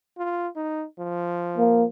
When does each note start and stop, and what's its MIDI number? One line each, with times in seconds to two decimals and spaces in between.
0.17 0.48 65
0.56 0.86 63
0.99 1.87 53
1.58 1.84 58